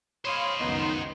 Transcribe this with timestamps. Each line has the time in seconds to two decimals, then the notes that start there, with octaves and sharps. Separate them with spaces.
0.25 C5 C#5 D#5 F5 B5 C6
0.59 C#2 F#2 D#3 B3 D#4